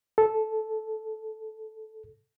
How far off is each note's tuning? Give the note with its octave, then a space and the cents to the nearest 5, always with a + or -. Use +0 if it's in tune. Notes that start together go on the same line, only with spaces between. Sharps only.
A4 -10